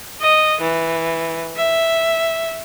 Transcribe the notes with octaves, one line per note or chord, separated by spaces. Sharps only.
D#5
E3
E5